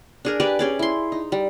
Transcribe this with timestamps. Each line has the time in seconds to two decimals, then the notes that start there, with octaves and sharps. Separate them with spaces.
0.25 D4 G#4 A#4
0.40 G4 B4 D5 G#5
0.59 C#4 G#4 D5
0.79 E4 C6
1.12 D#4
1.32 G3